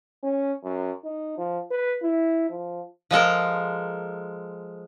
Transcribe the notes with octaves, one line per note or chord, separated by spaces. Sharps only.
C#4
F#2
D#4
F3
B4
E4
F3
F3 G#3 A4 A#4